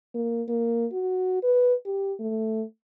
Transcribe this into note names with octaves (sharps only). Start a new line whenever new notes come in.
A#3
A#3
F#4
B4
G4
A3